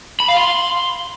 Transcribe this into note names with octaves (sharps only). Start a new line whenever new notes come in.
B5
F5
C6